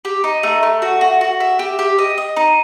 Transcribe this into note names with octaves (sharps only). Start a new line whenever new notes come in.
G4
D#4
A3
A3
F#4
F#4
F#4
E5
G4
G4
D#5
D#5
D#4